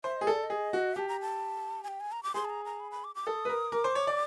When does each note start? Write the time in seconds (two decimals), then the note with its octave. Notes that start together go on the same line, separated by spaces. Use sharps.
0.04 C5 E5
0.17 G#4 D#5
0.27 A4 D5
0.43 D#5
0.50 G#4
0.73 F#4
0.96 G4 A5
1.08 A#5
1.21 A5
1.84 G#5
1.88 G5
2.00 G#5
2.12 A#5
2.23 D6
2.34 G#4 C6
2.45 A5
2.50 A#5
2.65 A#5
2.80 B5
2.91 B5
3.04 D6
3.15 D6
3.27 A4 D#6
3.45 B4
3.49 A#4
3.72 A#4 D6
3.84 C5
3.95 C#5
4.07 D5